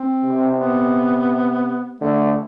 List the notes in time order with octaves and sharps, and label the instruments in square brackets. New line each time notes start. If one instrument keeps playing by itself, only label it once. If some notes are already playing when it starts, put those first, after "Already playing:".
Already playing: [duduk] C4
[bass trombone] C3
[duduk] B3
[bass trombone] D3 [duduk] A3